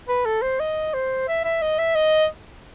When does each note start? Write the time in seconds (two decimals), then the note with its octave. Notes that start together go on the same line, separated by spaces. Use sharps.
0.08 B4
0.25 A4
0.42 C5
0.60 D#5
0.94 C5
1.28 E5
1.44 E5
1.62 D#5
1.79 E5
1.95 D#5